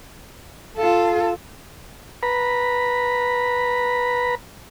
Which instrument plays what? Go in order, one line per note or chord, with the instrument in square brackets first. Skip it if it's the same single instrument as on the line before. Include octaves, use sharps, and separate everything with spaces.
[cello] F4 A4
[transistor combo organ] B4 A#5 B5